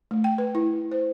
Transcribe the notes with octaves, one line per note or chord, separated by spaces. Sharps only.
A3
G5
B4
E4
C5